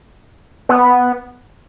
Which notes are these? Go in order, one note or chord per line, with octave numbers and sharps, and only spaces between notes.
B3